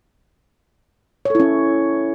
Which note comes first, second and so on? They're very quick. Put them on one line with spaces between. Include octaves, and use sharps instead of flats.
C#5 A4 E4 C#4